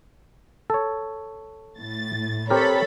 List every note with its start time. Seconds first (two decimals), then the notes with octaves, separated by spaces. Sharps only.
0.70 A4 C#5
1.78 A2 A6
2.50 C4 G4 A4 A#4 C#5 B5